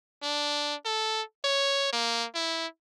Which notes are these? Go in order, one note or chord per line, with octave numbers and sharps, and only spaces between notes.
D4
A4
C#5
A#3
E4